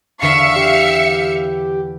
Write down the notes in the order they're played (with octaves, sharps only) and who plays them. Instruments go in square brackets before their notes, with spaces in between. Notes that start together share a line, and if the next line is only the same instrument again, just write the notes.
[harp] E2 D3 D4 [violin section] E5 F5 C#7 [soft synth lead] C#6
[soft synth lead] G4